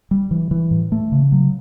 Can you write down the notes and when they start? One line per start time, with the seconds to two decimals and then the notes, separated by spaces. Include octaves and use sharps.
0.11 G3
0.31 E3
0.51 E3
0.71 A2
0.92 A3
1.12 C#3
1.32 F#3